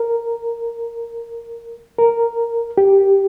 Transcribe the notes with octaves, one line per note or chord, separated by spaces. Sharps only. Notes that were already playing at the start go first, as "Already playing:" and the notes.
Already playing: A#4
A#4
G4